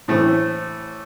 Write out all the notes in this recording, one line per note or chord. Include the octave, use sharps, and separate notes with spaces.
A2 E3 A3 C4